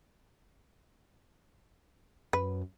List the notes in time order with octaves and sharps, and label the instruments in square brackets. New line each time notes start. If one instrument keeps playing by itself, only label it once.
[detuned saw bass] F#2 [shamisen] B4